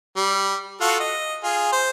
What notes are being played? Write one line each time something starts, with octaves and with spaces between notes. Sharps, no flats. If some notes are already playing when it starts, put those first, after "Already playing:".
G3
F4 F#4 A4
D#5
F4 G#4
C5